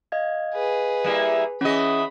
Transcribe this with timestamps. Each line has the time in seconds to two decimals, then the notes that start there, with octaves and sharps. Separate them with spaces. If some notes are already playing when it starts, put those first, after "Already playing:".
0.12 D#5 F5 G#6
0.54 G#4 B4
1.04 G3 A#3 E4
1.61 E3 C#4 G#4 D#5 B5